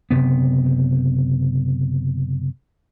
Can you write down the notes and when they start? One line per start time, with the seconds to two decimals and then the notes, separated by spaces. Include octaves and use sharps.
0.11 F#1 C3 B3